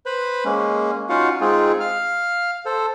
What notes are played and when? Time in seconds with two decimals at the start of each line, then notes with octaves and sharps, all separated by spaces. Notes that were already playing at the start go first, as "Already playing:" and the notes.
0.06 B4 C5 B5
0.45 G#3 A#3 C#4
1.09 C#4 D#4 F4 F#4 F5 F#5
1.41 G#3 C4 D#4 F4 G#4
1.80 F5 F6
2.66 A4 C5